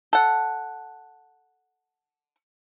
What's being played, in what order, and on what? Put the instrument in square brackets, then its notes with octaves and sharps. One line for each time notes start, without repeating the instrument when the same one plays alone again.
[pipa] A4 F#5